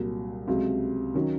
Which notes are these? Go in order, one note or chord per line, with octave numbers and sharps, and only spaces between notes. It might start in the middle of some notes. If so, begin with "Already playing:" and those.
Already playing: C2 A#2 F#3
C#2 C3 F#3
D#3 F#3 C#4